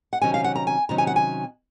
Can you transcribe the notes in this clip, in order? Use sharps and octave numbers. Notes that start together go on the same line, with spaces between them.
F#5
C3 D#3 F#3 C#4 G#5
F5
F#5
A#5
G#5
C3 D#3 F#3 C#4 A#5
G#5
F#5
G#5